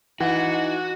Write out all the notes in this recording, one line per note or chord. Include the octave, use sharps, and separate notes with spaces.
E3 D#4 F#4 F#5